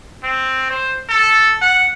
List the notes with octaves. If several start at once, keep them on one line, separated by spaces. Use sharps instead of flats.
C4
C5
A4
F#5